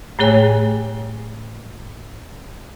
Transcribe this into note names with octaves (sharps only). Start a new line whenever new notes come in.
A2 A3 G#4 C#5 G5 G#5